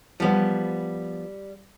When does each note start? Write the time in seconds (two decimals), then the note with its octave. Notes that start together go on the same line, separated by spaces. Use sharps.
0.20 F3 G3 B3